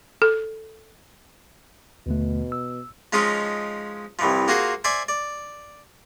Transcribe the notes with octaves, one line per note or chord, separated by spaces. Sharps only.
A4
D#2 B2 D3 A3
E6
F3 G#3 C#4 D#4 F4
C2 E3 F3
A#3 F4 F#4 G#4 C5
C5 D5 E5 G#5
D5